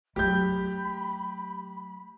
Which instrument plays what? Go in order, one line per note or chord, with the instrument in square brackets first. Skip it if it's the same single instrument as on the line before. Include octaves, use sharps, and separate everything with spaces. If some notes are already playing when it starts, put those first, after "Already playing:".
[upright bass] F#3 A3 [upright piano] G4 G6 [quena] B5